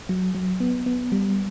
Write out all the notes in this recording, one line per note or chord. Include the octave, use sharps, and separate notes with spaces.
F#3
F#3
B3
B3
G3